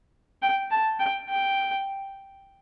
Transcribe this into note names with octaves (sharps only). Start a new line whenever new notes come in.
G5
A5
G5
G5